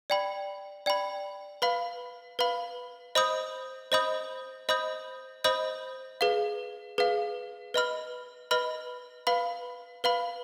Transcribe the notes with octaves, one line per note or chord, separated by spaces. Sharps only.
D5 G5 B5
D5 G5 B5
B4 F5 B5
B4 F5 B5
C5 D#5 B5 D#6 G6
C5 D#5 B5 D#6 G6
C5 D#5 B5 D#6 G6
C5 D#5 B5 D#6 G6
G#4 B4 F5
G#4 B4 F5
B4 D#5 B5 F6
B4 D#5 B5 F6
B4 F5 B5
B4 F5 B5